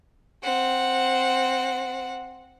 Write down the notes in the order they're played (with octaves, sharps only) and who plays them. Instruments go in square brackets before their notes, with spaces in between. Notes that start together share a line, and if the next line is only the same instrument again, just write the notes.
[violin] C4 F#5